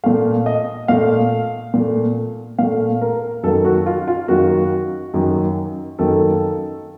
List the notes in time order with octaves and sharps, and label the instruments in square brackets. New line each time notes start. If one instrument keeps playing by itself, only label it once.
[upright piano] A#2 A3 F5
D#5
A#2 A3 F5
A#2 A3
A#2 A3 F5
A#4
F#2 D#3 A#3 A4
F#4
F4
F4
F#2 D#3 A#3 F#4
F#2 D#3 A#3
F#2 D#3 A#3 A4